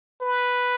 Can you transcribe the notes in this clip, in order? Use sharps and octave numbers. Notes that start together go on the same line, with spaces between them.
B4